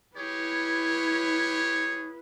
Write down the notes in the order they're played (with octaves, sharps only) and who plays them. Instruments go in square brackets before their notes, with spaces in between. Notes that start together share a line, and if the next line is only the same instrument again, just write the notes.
[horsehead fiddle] E4 B4 [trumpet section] G4 G#4 C#5